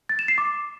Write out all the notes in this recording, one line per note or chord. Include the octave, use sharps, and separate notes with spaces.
A6
E7
C7
D6